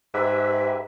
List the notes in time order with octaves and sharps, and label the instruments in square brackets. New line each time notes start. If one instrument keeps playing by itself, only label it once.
[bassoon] G#2 [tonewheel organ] G4 B4 E5